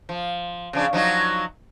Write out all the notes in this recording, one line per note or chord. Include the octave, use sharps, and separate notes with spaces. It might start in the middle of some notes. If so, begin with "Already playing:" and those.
F3
C#3 F3 D4
F3 F#3 D#4